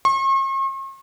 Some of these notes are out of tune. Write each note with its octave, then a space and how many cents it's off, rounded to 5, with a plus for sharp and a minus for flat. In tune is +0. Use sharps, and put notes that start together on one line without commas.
C#6 -45